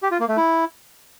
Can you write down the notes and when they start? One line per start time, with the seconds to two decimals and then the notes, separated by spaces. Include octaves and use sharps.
0.03 G4
0.11 F4
0.20 A#3
0.28 A3
0.37 E4